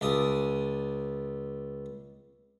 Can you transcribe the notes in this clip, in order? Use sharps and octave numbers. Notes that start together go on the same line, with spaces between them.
C#2 D5 D#6